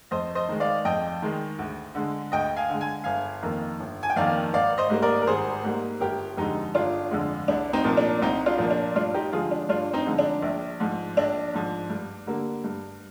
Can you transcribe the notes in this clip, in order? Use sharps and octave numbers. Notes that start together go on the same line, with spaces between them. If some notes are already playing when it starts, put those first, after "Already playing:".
F2 C5 D#5
C5 D#5
D#3 G#3
D5 F5
F2 D#5 G5
D#3 G#3
D2
D3 G#3
D2 D#5 G5
F5 G#5
D3 G#3
G#5
G1 F5 G#5
F2 D#3 A#3
G1
G#5
G5
F2 D#3 A#3 D5 F5
G#1 D5 F5
C5 D#5
G#2 G3 A#3
A#4 D5
A#4
G#1 G#4 C5
G#2 G3 A#3
G1 G4 A#4
F2 D3 G#3 D#4 G4
G1 D4 F4
F2 D3 G#3
C2 D4
C4 D#4
A#2 F3 A#3
D4
C2 C4 D#4
D4 F4
A#2 F3 A#3
D4
G2 D4 F4
D#4 G4
D3 F3 G#3 F4 G#4
D4
G2 D4 F4
C4 D#4
D3 F3 G#3
D4
A#1
G#2 F3
A#1 D4
G#2 F3
G2
D3 G3 A#3
G2